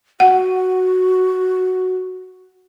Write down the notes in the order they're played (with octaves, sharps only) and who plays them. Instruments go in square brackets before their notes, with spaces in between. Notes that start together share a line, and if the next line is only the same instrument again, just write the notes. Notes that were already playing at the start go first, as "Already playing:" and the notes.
[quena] F#4 [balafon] F#5